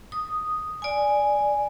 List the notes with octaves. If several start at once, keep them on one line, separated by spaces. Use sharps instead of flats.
D#6
D5 G#5